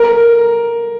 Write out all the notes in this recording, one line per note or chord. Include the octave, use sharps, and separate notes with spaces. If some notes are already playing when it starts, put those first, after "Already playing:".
Already playing: A#4